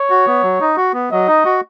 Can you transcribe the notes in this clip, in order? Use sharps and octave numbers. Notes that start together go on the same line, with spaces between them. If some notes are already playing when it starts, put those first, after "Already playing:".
Already playing: C#5
F#4
B3
F#3
D#4
F#4
B3
F#3 D#5
D#4
F#4